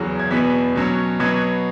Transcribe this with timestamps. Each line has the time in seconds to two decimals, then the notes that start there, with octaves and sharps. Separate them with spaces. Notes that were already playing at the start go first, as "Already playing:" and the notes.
Already playing: E2 C#3 F#3
0.19 G#6
0.31 E2 B2 B3 B6
0.76 B2 F#3 C#4
1.20 B2 F#3 B3 G#6